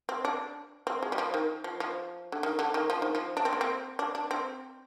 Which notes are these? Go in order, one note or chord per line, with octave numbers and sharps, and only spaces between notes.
C4
D4
C4
G#3
G3
F3
D#3
F3
F3
D3
D#3
D3
D#3
F3
D#3
F3
D4
C4
A#3
C4
D4
D4
C4